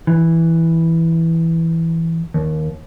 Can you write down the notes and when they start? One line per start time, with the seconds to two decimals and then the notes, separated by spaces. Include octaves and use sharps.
0.07 E3
2.34 D#2